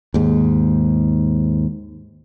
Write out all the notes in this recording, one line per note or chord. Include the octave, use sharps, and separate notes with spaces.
D#2 G#2